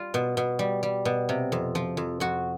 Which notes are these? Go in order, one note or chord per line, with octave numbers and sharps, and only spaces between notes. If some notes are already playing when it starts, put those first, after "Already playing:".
Already playing: G3 F4
B2
B2
G3
G3
B2
C3
F2
F3
F2
F2 F#4